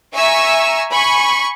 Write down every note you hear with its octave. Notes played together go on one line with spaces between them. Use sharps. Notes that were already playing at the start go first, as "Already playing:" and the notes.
E5 G#5 A#5 C#6 E6
G#5 B5 C#6